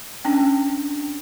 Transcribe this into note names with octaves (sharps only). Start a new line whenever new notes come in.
C#4 D4 G5